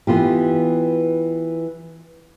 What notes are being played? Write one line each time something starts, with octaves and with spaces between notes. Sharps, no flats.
E3 B3 F4 G4